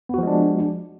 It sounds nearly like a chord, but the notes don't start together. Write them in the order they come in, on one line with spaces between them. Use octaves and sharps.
B3 F#4 F3 G#3 D4